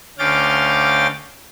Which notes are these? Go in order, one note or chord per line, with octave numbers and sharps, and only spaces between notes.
D2 C#4 F5 G5 D6 A6